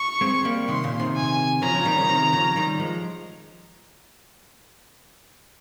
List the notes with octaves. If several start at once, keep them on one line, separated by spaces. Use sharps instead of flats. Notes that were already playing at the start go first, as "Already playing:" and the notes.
Already playing: C#6
G#3 C4
G3 A#3
C3 D#3 C6
A#2 C#3
C3 D#3
G#5
C#3 F3 A#5
C#3 F3
D#3 G3
C#3 F3
C3 D#3
C#3 F3
D#3 G3
F3 G#3